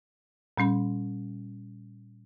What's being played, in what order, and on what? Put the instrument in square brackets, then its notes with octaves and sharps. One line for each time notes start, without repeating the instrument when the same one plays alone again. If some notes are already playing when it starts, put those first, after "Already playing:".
[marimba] A#2 G3 C#4 B5